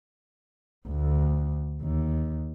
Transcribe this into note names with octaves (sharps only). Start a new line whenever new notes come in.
D2
D#2